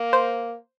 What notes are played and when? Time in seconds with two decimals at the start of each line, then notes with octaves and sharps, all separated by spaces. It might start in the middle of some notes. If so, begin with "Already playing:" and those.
Already playing: A#3
0.13 C5